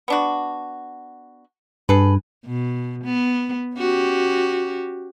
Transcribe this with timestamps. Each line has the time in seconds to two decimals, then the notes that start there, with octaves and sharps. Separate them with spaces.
0.08 B3 D4 F#4
1.89 G2 G#4 A4 B4
2.46 B2
3.04 B3
3.76 C#4 F#4 G4